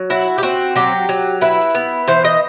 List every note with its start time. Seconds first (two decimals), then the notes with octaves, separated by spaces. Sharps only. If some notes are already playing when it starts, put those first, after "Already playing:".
Already playing: F#3
0.10 E4 F#4
0.38 G4
0.43 C4 F#4
0.76 F#3 G4
1.09 F#3
1.41 E4 B4
1.75 B3
2.08 E3 C5
2.25 D#5